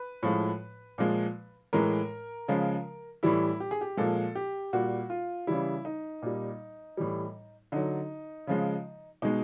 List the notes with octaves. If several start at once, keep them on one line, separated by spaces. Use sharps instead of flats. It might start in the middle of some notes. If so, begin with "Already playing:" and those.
Already playing: B4
A2 F3 G#3
A#2 F3 G#3
A2 E3 G#3 A#4
C#3 F3 G#3
A2 E3 G3 E4
G4
G#4
G4
A#2 F3 G#3 A4
G4
A#2 G3 F#4
F4
C#3 E3 G3 E4
D#4
A#2 G3
A2 E3 G3
D3 F#3 D#4
C#3 F3 G#3
B2 G#3 D#4